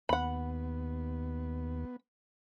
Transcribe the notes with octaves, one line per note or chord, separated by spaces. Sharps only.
D#2 B3 F#5 B5